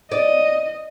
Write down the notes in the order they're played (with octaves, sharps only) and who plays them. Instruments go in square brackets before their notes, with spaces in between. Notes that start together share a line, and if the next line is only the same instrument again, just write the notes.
[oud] D5 [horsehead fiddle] D#5